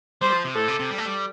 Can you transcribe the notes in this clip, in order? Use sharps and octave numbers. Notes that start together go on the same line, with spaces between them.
G3 C5
F3
C3
A2 A4
C3
C3
G3
A3
G3